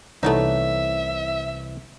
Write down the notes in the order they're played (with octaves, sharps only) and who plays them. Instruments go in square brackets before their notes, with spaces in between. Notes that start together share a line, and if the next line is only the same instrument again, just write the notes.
[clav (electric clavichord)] C2 E3 C#5 [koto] A3 B3 D#4 [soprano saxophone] E5